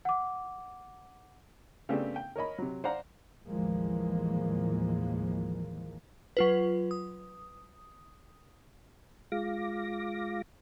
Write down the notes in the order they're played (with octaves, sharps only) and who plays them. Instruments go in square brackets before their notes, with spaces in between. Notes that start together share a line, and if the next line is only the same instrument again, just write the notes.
[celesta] F#5 D6
[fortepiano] C#3 A3 B3 C4 D4 G4
G5
A#4 C#5 D#5 B5
C3 F#3
C5 D5 F5 F#5 A#5
[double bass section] A1 D#2 E3 F3 G#3 A#3
[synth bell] F#3 F4 B4
D#6
[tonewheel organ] G#3 F4 F5 D6 A#6